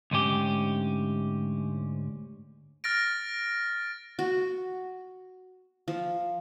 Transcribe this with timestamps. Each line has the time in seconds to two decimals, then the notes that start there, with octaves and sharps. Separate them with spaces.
0.11 D2 G#2 C#4 G4
2.84 F6 A6 A#6 D7
4.19 F#4
5.88 F3